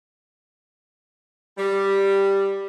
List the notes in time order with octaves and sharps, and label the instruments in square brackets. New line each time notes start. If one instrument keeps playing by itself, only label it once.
[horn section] G3